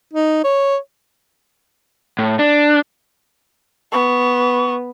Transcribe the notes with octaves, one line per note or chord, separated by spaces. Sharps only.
D#4
C#5
A2
D4
B3 C#6